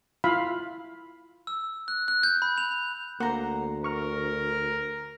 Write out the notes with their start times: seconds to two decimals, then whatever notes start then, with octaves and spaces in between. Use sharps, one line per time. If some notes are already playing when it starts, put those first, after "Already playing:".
0.24 E4 F4 F5 B5
1.47 E6
1.88 F#6
2.08 F#6
2.23 G6
2.42 B5
2.58 F7
3.20 D2 A#3 C5 F#5 A#5
3.84 A#4 C#6 F6